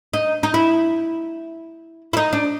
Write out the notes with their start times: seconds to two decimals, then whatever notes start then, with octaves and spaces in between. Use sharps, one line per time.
0.13 D#4
0.43 D#4
0.54 E4
2.13 E4
2.17 D#4
2.33 D4